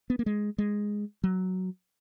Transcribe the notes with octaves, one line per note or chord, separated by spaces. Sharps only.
B3
A#3
G#3
G#3
F#3